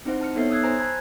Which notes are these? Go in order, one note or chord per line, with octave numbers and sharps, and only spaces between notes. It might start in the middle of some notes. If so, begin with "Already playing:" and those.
C4 D#4 E4 C5 F#5
A5 F6 C#7
B3 D#4 A4 C#5 E5 C7
D#6 E6 F#6 G#6 C7
C5 G#5 A#5
A5 B5 F#6 G#6